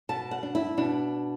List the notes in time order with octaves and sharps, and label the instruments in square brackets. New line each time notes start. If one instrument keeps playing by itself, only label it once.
[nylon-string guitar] B2 A5
F#5
D4
E4
B2 D4